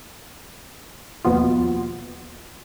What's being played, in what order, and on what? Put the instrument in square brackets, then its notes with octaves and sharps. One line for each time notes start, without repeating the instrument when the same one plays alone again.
[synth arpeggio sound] D#2 B2 F3 B3 F4